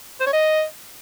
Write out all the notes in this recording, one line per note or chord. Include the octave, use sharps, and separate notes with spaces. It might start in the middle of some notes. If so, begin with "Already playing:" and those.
C5
C#5
D#5